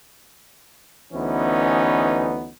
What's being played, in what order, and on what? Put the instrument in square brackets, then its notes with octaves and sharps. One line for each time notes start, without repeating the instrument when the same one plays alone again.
[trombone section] D2 E3 B3 C#4 D#4